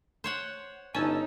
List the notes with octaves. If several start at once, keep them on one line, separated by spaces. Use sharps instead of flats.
C5 C#5 F#5
G1 C#4 D#4 G#5 A5 E6